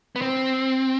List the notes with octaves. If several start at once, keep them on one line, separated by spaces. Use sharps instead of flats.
B3
C4